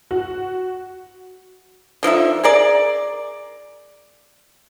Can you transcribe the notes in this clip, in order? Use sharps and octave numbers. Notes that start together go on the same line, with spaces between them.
F#4
D3 F3 D#4 E5
G#4 A#4 D5